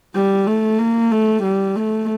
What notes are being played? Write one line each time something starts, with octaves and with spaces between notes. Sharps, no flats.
G3
A3
A#3
A3
G3
A3